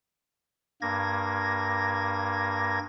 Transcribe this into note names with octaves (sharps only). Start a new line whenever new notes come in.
G2 A#3 G#6 A#6